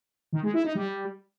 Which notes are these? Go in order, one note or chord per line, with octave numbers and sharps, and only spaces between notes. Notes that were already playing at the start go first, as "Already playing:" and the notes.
D#3
G#3
E4
D#4
G3